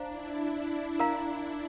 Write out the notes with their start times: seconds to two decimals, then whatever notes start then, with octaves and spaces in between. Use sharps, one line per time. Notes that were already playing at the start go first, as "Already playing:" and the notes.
Already playing: D4 C5 F5 A#5
0.08 E4
0.38 D4
0.99 A#4 F5 A#5